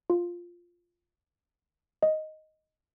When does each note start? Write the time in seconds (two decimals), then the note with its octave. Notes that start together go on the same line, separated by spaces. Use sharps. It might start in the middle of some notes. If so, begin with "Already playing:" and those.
0.10 F4
2.03 D#5